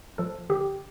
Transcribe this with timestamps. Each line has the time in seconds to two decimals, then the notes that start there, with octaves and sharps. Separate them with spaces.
0.18 F3 A4
0.50 D3 G4